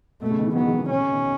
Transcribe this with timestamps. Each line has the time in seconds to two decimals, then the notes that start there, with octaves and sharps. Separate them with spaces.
0.22 B2 A3
0.31 C#3
0.39 B2 D#3
0.47 C#3 E3
0.55 D#3 F#3 B3
0.67 E3 G#3
0.73 D#3
0.78 C#3
0.90 B2 C#4
1.01 C#3
1.12 B2 D#3